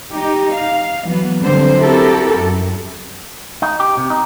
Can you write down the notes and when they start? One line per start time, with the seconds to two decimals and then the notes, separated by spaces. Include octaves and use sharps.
0.10 D#4 G4
0.54 F5
1.05 E3 F#3 B3
1.42 D3 F#3 G3 C4 C5
1.78 C4 E4 F#4 G4 A4 A#4
2.37 F#2
3.62 D#4
3.80 G4
3.97 C3
4.10 D#4